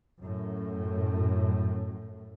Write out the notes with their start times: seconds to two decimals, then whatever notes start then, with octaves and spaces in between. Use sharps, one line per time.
0.20 F#2 A2